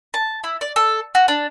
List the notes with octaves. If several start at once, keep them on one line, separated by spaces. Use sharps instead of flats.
A5
E4
D5
A4
F#4
D4